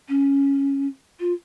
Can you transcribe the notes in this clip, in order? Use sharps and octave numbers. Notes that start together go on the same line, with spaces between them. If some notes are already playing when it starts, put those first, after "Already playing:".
C#4
F4